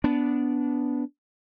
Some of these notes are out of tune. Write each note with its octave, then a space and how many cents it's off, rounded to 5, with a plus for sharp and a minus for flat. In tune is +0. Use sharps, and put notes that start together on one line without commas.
B3 +0 D4 -15